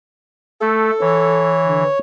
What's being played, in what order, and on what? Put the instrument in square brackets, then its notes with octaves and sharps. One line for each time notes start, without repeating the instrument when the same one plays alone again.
[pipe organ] A3 [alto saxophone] A4
[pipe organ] E3 [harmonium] C#5
[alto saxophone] D3